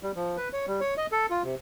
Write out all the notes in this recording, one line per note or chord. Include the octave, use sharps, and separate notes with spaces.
G3
F3
B4
C#5
G3
C#5
D#5
A4
F4
C3